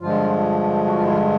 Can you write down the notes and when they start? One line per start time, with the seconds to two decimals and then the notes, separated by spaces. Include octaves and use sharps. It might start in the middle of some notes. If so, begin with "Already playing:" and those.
0.01 G2 D3 F3 G#3 F4
0.87 F#4
0.94 F4
1.04 E4
1.12 F3 F4